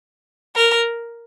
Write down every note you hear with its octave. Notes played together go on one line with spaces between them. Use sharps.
A#4